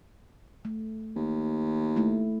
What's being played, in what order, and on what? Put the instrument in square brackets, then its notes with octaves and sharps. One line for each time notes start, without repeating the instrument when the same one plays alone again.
[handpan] A3
[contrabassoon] D#2
[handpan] A3 E4